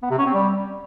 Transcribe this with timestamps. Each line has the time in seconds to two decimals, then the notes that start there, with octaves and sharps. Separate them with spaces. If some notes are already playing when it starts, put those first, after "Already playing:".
0.03 B3
0.11 C3
0.18 C#4
0.26 C4
0.34 G3